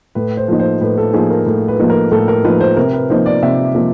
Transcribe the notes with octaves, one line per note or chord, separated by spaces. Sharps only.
A2 B4
C5
F3 A#3 D#4
C5
A2 B4
A4
F3 A#3 D#4 G#4
A#4
A2
B4
F3 A#3 D#4
A#4
A2 A4
A#4
F3 A#3 D#4 B4
C5
C3 A#4
B4
F3 A#3 D#4 C5
D5
C3 E5
F3 A#3 D#4